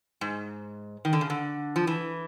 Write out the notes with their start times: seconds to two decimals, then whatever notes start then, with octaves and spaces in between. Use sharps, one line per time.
0.21 G#2
1.05 D#3
1.13 D3
1.21 C#3
1.30 D3
1.76 F3
1.87 E3